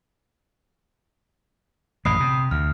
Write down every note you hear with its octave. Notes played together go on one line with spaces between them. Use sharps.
A1 F#2 A#2 B5 D#6 C7
C3
D2 F6